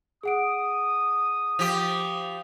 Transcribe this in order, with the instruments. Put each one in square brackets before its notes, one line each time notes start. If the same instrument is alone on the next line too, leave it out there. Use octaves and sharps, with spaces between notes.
[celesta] G#4 F#5 D7 [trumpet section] D#6
[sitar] F3 G4